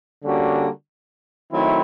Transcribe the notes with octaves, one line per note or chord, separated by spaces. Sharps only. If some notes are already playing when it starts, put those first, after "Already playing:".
D3 G3 A#3 C#4 F#4
D#3 F#3 A3 C4 E4